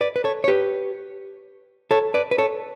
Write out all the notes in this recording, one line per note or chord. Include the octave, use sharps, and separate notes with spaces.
B4 D5
B4
A4 C#5
C#5
G4 B4
A4 C#5
B4 D5
B4
A4 C#5